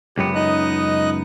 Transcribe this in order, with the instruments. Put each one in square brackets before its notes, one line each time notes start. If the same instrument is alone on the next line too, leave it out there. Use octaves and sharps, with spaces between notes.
[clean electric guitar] C#2 F#2 B3 [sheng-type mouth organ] G4
[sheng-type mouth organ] D#4 D#5 F#6